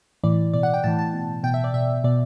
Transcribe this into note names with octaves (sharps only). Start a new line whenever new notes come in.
A2 E3 D5
B2 D5
F#5
G5
A2 E3 A5
A5
B2
B2 G5
E5
D5
B2 E5
B2 D5